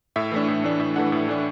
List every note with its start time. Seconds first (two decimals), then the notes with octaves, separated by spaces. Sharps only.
0.16 A2 E5
0.32 E3 A3 D4
0.48 A2
0.64 E3 A3 D4
0.79 A2 E5
0.96 E3 A3 D4 F#5
1.12 A2
1.28 E3 A3 D4